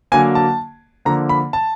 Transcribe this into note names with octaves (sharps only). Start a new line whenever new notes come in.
D3 F#3 A#3 G#5
A5
D3 F3 A#3 A#5
B5
A5